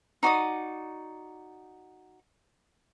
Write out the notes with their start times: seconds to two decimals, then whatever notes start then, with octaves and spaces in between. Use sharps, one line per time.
0.23 D#4 F#4 D5 D#6